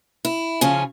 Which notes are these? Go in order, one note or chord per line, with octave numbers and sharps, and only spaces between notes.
E4
C#3 F3 C#4 F4